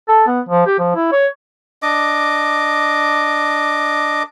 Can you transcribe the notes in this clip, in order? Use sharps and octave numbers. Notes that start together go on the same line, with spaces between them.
A4
B3
F3
G4
F3
E4
C#5
D4 D#5 D6